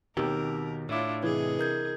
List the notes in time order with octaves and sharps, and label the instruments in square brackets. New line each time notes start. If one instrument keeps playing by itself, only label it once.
[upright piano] D#2 G4 [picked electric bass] B2 D#3 [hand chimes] C4 E6 D7 [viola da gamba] A#4
[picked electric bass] A2 [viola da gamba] D4 E4 F4 [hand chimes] C#5 D6
[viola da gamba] C3 G#4 D#5 [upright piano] E3 [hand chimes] B4
[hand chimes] A#4 G6 G#6